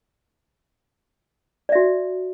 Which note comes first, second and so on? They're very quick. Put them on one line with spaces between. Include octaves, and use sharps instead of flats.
D5 E5 F#4